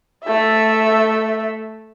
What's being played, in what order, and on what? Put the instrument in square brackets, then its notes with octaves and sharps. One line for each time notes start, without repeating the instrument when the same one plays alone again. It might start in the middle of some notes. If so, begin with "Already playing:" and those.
[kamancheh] A3 E5